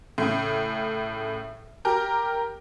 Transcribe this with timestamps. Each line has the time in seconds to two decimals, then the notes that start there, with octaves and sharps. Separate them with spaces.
0.18 A2 C#3
1.85 G4 A#4